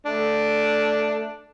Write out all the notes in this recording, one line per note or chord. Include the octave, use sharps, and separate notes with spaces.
A3 D4